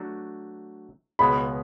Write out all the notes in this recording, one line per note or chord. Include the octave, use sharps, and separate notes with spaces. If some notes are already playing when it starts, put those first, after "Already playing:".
Already playing: F#3 A3 D4 F#4
C#2 B2 G#3 B3 B5